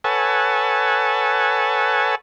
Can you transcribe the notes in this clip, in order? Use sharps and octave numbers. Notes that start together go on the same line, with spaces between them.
A4 B4 C#5 F#5 G#5 A5